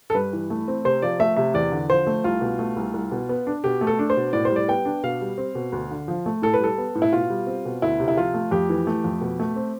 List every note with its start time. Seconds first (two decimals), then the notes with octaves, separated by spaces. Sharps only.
0.10 A4
0.15 G2 B4
0.33 E3
0.50 A3
0.68 C4
0.85 C3 C5
1.02 F3 D5
1.20 A3 E5
1.37 C3 E5
1.54 E2 D5
1.72 D3
1.89 F3 C5
2.07 A3
2.24 C2 F4
2.41 B2
2.59 A3
2.77 C2
2.94 C2
3.11 B2
3.29 B3
3.47 D4
3.64 B2 G4
3.81 A3
3.87 A4
3.99 D4
4.10 C5
4.17 B2
4.33 A2 D5
4.45 C5
4.50 G3
4.56 D5
4.68 B3 G5
4.85 D4
5.03 B2 F5
5.21 G3
5.38 C4
5.55 B2
5.72 D2
5.91 D3
6.08 F3
6.26 A3
6.42 A2 A4
6.54 B4
6.60 G3 A4
6.78 B3
6.95 A2
7.02 E4
7.13 B2 F4
7.30 G3
7.47 C4
7.65 B2
7.82 D2 E4
8.00 C3
8.08 E4
8.17 F3 F4
8.34 A3
8.51 F2 G4
8.69 E3
8.87 A3
9.04 F2
9.21 B2
9.40 A3
9.56 C4